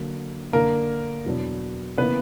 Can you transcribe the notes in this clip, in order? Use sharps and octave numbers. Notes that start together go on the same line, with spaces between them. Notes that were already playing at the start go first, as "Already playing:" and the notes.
Already playing: D3 F#3 A#3
D3 A#3 D4 A#4
E2 B2 F#3 B3 D4
C#3 E3 A#3 B3 B4